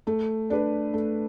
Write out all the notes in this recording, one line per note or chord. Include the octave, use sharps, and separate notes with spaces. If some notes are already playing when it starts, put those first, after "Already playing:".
A3
D4 B4
A3